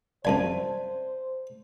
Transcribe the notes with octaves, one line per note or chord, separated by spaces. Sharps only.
C2 F#2 C5 D5 F5 G#5 A5